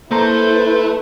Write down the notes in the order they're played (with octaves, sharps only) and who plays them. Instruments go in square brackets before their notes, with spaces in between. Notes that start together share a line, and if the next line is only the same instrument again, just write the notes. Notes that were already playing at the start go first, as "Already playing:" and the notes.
[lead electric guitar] A3 A4 [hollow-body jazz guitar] A#3 A#5 [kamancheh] E4 B4 [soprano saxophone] C5